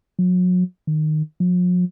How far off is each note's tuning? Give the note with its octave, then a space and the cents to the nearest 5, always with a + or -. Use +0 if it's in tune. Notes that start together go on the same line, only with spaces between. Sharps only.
F#3 -35
D#3 -15
F3 +45